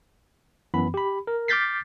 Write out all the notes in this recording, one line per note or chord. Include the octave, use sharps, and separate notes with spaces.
F#2 E3 B3 B5
G4 B5
A#4
D6 F6 G6 A6 B6 C7